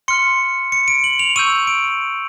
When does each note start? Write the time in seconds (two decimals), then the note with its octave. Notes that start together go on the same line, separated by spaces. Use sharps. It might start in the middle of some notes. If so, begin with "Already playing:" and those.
0.08 C6 F6 C#7
0.72 C#7
0.88 D7
1.04 F#7
1.19 F7
1.36 C#6 E6 G6 D#7
1.67 D7